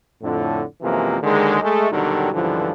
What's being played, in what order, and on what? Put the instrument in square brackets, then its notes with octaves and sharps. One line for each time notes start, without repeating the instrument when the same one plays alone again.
[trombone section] F2 A2 D3
F#2 C3 E3 F3 G#3 A#3
D#2 D3 D#3 G#3
G#3 A3
D#2 B2 D3 D#3 F#3 G3
C#2 G2 D3 E3 F3